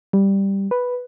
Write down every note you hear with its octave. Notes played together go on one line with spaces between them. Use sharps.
G3
B4